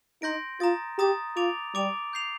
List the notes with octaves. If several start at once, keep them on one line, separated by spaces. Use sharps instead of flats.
D#4 C6 G6 A#6 D7
F4 A#5 D#6 A6
G4 A#5 D#6 A6
F4 D6 A6 D7 F7
G3 D6 A6 D7 F7
G6 C7 F7